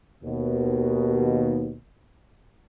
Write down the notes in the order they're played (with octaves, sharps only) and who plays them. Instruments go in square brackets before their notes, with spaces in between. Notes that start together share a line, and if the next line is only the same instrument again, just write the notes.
[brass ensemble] D#2 B2